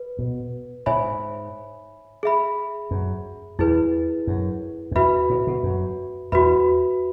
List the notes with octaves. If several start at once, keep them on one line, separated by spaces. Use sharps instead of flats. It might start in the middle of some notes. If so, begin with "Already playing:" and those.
Already playing: B4
B2
G#2 C#5 E5 G#5 B5
G#4 E5 B5
F#2
E2 E4 G#4 B4
F#2
F#2
E2 F#4 B4 E5 B5
G#2
B2
F#2
E2 F#4 B4 E5 B5